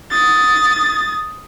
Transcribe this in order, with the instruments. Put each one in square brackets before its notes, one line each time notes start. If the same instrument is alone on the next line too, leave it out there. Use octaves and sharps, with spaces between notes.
[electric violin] D#6 A6